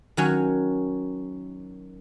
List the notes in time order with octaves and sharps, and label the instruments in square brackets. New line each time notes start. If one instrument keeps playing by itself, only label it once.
[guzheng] D#3 F#3 C#4